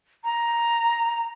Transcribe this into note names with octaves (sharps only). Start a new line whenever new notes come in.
A#5